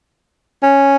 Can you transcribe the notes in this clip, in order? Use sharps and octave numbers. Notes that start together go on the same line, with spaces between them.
C#4